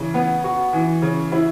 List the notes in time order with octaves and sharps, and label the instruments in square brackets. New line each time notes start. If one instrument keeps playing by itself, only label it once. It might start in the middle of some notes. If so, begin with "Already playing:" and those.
Already playing: [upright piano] C#3 E3
B3
F#4
E3
C#3
E4